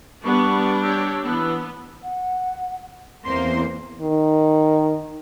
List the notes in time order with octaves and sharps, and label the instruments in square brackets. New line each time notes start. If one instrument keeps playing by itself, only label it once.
[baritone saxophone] G3 [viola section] B3 [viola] D4 [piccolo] C#6
[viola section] G4 C#5 [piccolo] E6
[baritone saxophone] E3 [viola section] B3 [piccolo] E6
[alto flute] F#5
[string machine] E2 [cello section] A#3 C5 [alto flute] C4 [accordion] C6
[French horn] D#3